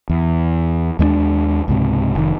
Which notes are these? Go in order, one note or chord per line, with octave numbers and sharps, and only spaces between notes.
E2
D#2 G#3 A#3 D4
C#2 G#2 C3
F1 D#3